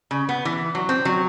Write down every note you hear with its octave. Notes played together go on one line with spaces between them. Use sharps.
C#3
B3
E3
F#3
C4
F#3